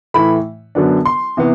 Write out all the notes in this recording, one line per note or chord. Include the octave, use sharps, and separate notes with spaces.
A2 E3 A3 B5
F#2 D3 F#3 B3 D4
C6
C3 E3 B3